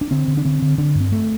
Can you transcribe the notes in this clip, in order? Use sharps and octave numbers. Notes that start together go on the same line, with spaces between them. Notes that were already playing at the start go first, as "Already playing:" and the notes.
D4
D3 C4
D3
D4
D3 C4
D3
D3 D4
G2
C4
A3